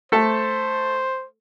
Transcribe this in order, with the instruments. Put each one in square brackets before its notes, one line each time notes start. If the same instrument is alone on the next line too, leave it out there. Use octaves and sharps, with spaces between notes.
[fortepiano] A3 A4 [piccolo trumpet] C5